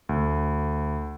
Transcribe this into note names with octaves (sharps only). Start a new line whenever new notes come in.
D2